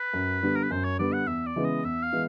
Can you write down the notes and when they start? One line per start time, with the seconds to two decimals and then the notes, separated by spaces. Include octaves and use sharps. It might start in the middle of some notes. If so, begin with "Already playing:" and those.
Already playing: B4
0.13 F#2
0.42 D3 G3 B3
0.55 A#4
0.63 B4
0.71 F#2 C5
0.84 C#5
0.99 D3 G3 B3 D5
1.13 F#5
1.27 E2 E5
1.46 D5
1.56 C#3 E3 G#3 B3
1.65 D#5
1.84 E2 E5
2.03 F5
2.13 E3 G#3 B3